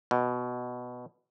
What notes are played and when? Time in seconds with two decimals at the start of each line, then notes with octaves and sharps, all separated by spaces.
0.11 B2